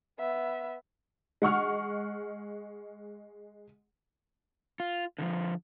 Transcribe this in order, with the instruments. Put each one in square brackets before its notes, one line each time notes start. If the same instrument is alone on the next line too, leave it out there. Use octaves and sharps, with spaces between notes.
[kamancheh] B3 E5
[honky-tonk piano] G#3 F#5 C#6 F6
[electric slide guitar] F4
D3 D#3 F3